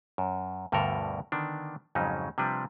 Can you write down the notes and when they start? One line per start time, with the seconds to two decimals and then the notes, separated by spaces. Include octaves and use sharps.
0.18 F#2
0.72 D2 G2 B2 D3 A4 A#4
1.32 D3 D#3 B3 D4
1.95 F2 G#2 C#3 F#3 C#4 D#4
2.38 C3 F3 G3 D4 B4